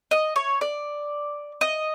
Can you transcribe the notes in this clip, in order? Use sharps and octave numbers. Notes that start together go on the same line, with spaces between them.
D#5
C#5
D5
D#5